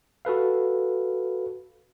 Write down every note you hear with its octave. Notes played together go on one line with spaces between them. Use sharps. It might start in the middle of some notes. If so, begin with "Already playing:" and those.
F#4 A4 B4 F5